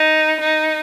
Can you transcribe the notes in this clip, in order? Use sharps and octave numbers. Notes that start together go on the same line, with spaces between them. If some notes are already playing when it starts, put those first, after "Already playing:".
Already playing: D#4
D#4